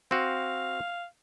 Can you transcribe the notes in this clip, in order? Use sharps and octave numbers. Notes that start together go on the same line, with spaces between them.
C4 F#4 F5